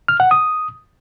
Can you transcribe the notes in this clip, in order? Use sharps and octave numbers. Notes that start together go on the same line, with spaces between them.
F6
F#5
D#6